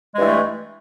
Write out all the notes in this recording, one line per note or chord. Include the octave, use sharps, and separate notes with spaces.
G2 E3 G#3 A3